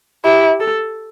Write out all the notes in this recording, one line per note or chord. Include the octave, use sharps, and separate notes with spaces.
E4 G4
A4